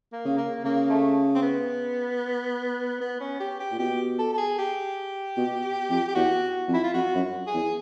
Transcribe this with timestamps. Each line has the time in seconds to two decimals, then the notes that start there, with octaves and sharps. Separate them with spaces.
0.12 A#3
0.25 C#3
0.38 A#3
0.65 C#3 A#3
0.90 A3
1.35 C4
1.42 B3
3.01 B3
3.20 C#4
3.40 G4
3.60 G4
3.71 A#2
3.79 B2 G4
4.19 A4
4.33 A4
4.38 G#4
4.58 G4
5.37 B2
5.90 F2
6.08 G4
6.15 E2 F#4
6.68 F2
6.74 E4
6.84 F4
6.94 F2 F#4
7.14 F#2
7.47 G#4
7.54 E2